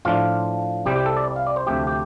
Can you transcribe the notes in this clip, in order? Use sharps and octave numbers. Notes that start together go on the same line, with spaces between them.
A2 F3 D4 F4
C2 C3 G3 C4 G4
G4
A4
D5
F5
D5
C5
D2 C3 F3 A3 C4 G4
G4